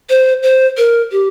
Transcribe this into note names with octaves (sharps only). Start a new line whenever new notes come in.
C5
C5
A#4
G4